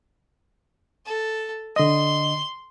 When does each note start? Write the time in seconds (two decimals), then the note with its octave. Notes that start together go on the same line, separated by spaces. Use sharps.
1.06 A4
1.76 D3 D#5 C6